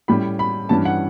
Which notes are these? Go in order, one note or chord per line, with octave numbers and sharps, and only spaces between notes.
A2 G3 C#4 B5
B5
G2 E3 G3 C#4 A5
F#5